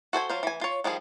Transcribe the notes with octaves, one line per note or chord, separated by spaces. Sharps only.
F#4 A4 C5 G#5
F#3 F4 C5
E3 G#5
F4 C#5
D#3 F3 G3 G#4